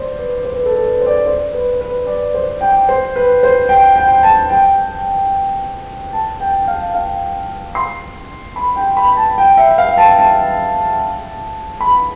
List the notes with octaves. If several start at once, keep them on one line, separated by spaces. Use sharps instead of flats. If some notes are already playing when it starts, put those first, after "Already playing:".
Already playing: C5 D5
B4
C5
B4
A4
A4
B4
C5
D5
C5
B4
B4
D5
C5
G5
C5
B4
C5
G5
G5
A5
G5
A5
G5
F5
F5
C6
B5
G5
B5
A5
G5
E5
F5
A5
A5
B5